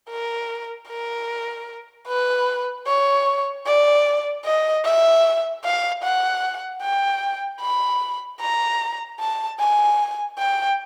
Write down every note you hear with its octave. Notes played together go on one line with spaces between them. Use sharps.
A#4
A#4
B4
C#5
D5
D#5
E5
F5
F#5
G5
B5
A#5
A5
G#5
G5